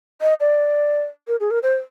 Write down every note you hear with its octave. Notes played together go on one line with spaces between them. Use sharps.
D#5
D5
A#4
G#4
A#4
C5